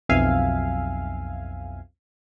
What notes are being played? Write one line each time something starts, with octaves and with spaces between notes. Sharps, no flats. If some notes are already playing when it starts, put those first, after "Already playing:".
B1 F2 E5 F5 G#5